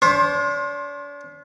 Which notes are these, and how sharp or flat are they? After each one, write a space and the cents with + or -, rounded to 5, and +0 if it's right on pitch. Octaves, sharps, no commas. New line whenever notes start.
D4 -40 C5 +20 C6 +30